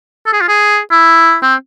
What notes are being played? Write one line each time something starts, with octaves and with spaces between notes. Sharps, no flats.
A4
G#4
F4
G#4
E4
C4